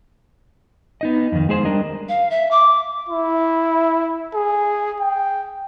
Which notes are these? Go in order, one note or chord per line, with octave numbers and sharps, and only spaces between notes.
B3 D#4 D#5
F2 D#3
G#3 G#4 C5
G3 D4 A#4 D#5
F5
E5
D6
E4
G#4
G5